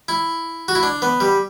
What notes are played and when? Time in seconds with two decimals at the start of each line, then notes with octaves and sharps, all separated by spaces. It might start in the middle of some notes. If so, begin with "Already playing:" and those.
0.08 E4
0.68 F#4
0.75 E4
0.83 D4
1.02 B3
1.20 G3